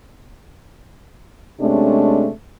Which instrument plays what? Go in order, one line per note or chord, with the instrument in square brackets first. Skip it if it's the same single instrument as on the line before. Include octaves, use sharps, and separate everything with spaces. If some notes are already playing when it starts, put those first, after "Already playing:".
[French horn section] C3 G#3 A3 C#4 D4